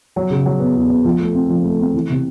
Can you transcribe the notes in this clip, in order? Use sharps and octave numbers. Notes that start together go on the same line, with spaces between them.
F#3
C#3
F#3
B3
E2
B3
F3
A3
C4
F3
A3
C4
E3
C3